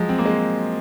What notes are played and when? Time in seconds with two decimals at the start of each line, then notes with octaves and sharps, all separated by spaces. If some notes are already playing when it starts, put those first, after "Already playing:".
Already playing: F3 F#3 G#3
0.09 C4
0.19 A#3
0.26 G#3